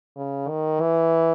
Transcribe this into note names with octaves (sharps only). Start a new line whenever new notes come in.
C#3
D#3
E3